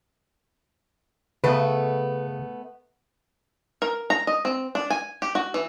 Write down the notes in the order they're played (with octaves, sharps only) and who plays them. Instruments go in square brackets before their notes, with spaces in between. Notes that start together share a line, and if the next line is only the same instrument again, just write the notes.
[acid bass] C#3 [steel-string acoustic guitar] A3 B3 [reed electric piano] B4
[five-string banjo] A#4
A#5
D#5
C4
D4
G#5
G4
F#4
E3